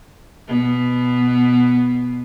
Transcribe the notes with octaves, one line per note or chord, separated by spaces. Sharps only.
B2 B3